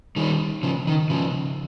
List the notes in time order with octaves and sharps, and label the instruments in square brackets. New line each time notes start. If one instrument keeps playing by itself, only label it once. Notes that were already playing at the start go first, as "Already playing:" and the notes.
[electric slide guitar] D#3 G3
C#3 F3
D#3
C#3 F3